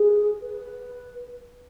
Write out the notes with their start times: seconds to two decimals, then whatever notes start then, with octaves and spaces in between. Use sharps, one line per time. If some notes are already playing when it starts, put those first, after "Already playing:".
Already playing: G#4
0.42 B4